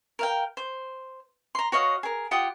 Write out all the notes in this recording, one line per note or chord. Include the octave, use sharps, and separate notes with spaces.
A#4 F5 G5
C5
A#5 C6
F#4 C#5 D#5 F5
G#4 A#4
F4 G4 F#5 D#6